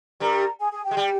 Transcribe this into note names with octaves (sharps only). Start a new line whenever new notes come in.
G2 G3 A#4 A#5
G#4 G#5
G#4 G#5
G4 G5
G#3
G3